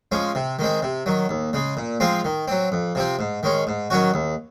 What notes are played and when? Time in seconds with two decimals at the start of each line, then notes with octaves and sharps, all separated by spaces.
0.12 F3 G#3 C#4
0.35 C3
0.59 D#3 G#3 C4
0.82 C3
1.06 D#3 F#3
1.29 D#2
1.53 C#3 G#3
1.77 A#2
2.00 F3 G#3 C4 F4
2.24 D#3
2.48 F#3 C4
2.72 F2
2.95 C3 F3 C4
3.19 G#2
3.43 D#3 G#3 C#4
3.67 G#2
3.90 D#3 F#3 C#4 F#4
4.14 D#2